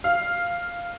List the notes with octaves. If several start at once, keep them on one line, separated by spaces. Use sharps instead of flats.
F5